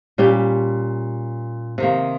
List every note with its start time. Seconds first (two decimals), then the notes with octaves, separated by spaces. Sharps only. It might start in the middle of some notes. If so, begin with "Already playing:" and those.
0.18 A#2 G3 C#4 G4
1.78 C3 D#3 A#3